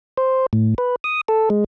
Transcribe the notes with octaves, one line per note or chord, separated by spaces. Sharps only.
C5
A2
B4
D#6
A4
G#3